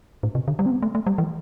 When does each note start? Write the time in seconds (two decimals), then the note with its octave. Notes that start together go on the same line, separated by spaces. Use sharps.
0.23 A2
0.35 C3
0.48 D3
0.59 G3
0.66 C4
0.71 B3
0.82 A3
0.95 A3
1.07 G3
1.18 E3